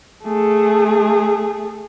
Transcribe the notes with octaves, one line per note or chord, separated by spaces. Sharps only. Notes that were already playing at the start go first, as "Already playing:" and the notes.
A3 G#4